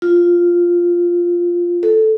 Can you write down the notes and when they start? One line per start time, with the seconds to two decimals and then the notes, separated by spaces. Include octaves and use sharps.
0.02 F4
1.83 A4